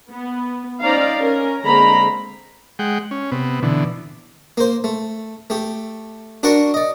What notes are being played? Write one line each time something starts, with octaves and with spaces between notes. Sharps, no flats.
B3
C#4 D#4 C5 D5 F5 A#5
C#4 A#4
D3 G#3 A#3 C4 A#5 B5
G#3 F#5 G5
C#4
C3 B3
B2 D3 E3
A#3 C5
A3
A3 G4
D4 F#4 A#4 D5 F#5 C#6
D5 D#5